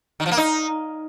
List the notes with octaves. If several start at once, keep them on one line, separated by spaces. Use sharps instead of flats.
D#3
F3
A#3
D#4